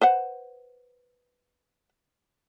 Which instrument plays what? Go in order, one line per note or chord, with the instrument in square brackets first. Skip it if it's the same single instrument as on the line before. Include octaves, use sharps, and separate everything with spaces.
[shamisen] B4 C5 F#5